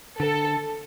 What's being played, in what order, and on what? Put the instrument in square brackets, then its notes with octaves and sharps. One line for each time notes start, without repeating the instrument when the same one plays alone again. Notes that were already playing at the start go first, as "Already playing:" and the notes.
[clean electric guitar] D3 [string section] A4